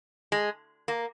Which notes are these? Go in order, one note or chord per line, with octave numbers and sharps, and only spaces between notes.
G#3
A#3